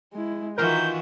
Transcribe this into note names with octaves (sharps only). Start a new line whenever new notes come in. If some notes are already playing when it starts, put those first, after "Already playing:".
G#3 E4
D#3 E3 F4 F#4 A#4 G6